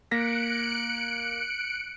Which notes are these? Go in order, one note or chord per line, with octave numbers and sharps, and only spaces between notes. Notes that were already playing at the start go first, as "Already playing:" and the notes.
A#3 F#6 A#6 B6 C#7 D7